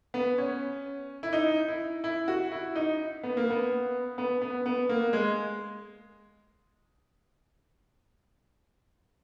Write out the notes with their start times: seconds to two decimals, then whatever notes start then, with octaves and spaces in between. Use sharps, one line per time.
0.14 B3
0.38 C#4
1.23 E4
1.33 D#4
1.68 E4
2.04 E4
2.28 F#4
2.52 E4
2.76 D#4
3.23 B3
3.37 A#3
3.50 B3
4.18 B3
4.42 B3
4.66 B3
4.89 A#3
5.13 G#3